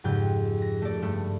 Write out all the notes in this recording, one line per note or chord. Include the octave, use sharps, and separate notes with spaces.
F2 G#2 C#3 G4 G6
A#6
A3 D5
G2 A3